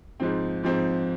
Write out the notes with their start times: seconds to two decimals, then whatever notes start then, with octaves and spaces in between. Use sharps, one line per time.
0.20 G#2 F3 C4
0.63 G#2 F3 C4